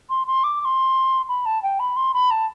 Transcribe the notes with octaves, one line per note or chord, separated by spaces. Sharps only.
C6
C6
D6
D6
C6
B5
A5
G5
B5
C6
B5
A5